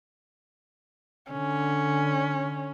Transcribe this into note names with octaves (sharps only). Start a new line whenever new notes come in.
D3 C#4